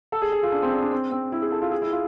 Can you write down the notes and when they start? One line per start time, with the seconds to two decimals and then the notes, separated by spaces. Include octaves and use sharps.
0.12 A4
0.22 G#4
0.32 G#4
0.43 F4
0.52 D4
0.62 C4
0.72 D4
0.82 D4
0.92 C4
1.11 C4
1.32 E4
1.42 G#4
1.52 A4
1.62 F4
1.72 G#4
1.82 E4
1.92 F4